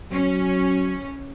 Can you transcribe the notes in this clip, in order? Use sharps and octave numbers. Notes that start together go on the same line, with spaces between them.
F#3 C#4